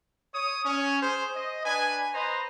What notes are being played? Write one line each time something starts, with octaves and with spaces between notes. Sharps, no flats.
C#5 D#6
C#4
G#4 C5
D#5
D4 B4 G#5
B4 C5 D#5 A#5